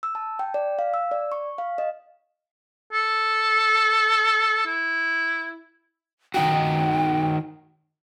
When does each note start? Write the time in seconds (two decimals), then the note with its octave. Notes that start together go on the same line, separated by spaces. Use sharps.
0.03 E6
0.15 A5
0.39 G5
0.54 D5
0.79 F5
0.94 E6
1.11 D5
1.32 C#6
1.58 F5
1.78 D#5
2.93 A4
4.66 E4
6.34 D#3 D#4 F#4 G5